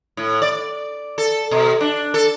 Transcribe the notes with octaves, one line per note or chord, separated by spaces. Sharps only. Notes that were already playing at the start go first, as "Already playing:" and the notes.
A2
D5
A4
B2
D4
A4